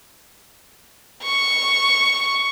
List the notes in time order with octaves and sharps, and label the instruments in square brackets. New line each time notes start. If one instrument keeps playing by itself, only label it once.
[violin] C#6